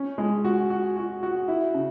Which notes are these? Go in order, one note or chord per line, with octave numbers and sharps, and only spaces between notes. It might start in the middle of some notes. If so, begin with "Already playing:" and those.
Already playing: C#4
G#3
F#4
F#4
F#4
F#4
E4
C#3